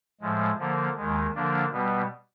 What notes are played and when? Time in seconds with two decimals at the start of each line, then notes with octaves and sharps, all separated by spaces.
0.21 A2 F3 G#3
0.58 D3 F3 A#3
0.96 D#2 D#3 G#3
1.35 D3 F3 A#3 D4
1.72 B2 G3 B3